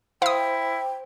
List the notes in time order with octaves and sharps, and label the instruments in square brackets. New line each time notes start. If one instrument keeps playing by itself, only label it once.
[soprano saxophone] E4 [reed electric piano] C5 [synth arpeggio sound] F5 D#6 [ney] G5